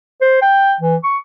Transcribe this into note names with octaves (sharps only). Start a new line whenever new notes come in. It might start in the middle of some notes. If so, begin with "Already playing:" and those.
C5
G5
E3
C#6